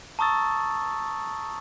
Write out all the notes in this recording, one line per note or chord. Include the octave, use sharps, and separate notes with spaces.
A5 A#5 C#6 D#6 E6 A6